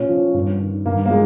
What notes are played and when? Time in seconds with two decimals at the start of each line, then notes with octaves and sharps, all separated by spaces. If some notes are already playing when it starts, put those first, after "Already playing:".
Already playing: A#2 C#4
0.09 F3
0.34 G2
0.61 D#3
0.86 G2 A#3
1.06 A#3
1.10 F3 G#3